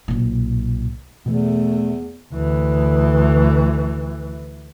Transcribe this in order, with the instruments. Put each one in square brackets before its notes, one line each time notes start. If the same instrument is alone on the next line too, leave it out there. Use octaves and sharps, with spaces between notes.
[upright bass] B1 A#2
[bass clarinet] E2 [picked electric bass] B2 E3 [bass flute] A3
[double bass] D2 E3